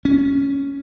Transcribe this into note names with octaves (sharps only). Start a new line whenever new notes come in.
C#4